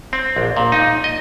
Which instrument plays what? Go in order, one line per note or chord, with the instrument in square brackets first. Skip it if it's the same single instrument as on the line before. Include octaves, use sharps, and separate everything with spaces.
[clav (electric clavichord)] C4
A#1
A#2
D#4
D#5